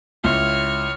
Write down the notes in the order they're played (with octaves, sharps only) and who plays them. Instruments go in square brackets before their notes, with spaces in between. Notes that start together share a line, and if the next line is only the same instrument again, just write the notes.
[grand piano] C#2 E4 F4 [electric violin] C#5 F6